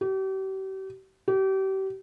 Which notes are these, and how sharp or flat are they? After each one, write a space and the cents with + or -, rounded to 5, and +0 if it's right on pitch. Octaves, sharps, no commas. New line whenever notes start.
G4 -40
G4 -35